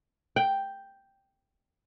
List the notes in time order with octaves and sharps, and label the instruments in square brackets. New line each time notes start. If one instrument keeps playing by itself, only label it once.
[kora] G5